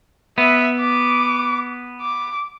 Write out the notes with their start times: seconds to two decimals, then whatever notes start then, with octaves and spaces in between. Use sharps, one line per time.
0.38 B3 E5
0.80 D6
2.01 D6